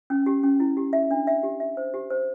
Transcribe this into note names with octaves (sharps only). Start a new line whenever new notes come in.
C#4
G4
C#4
E4
G4
E5
D4
E5
G4
E5
C5
G4
C5